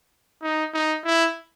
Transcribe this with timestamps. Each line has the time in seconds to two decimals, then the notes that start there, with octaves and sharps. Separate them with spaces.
0.43 D#4
0.74 D#4
1.05 E4